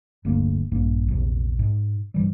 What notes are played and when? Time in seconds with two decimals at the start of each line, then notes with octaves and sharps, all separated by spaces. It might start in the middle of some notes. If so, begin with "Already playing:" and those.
0.25 D1 D2 G2 A#3
0.71 A#1 G2 A#3
1.08 A#1 E2 C3
1.59 G#2
2.14 G2 E3 G3